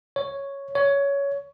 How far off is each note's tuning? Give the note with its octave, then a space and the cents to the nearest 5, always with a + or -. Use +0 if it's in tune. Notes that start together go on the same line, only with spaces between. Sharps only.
C#5 +0
C#5 +15